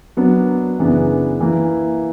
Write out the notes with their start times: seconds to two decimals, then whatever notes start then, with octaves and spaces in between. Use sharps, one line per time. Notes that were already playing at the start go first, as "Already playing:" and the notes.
0.17 F#3 B3 D4 A#4
0.78 F#2 C#3 E3 B3 D4
1.41 E3 A#3 E4